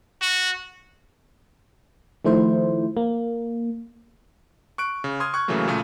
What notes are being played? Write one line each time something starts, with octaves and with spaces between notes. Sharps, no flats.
F#4
D#3 F3 A3 E4 C5
A#3
C#6 F#6 D7
C#3
C6 D#6 F6 G#6
C#6 F#6 G#6
A2 C#3 E3 F#3 A3 A#3
A#2 C#3 A3